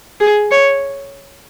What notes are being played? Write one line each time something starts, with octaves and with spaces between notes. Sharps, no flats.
G#4
C#5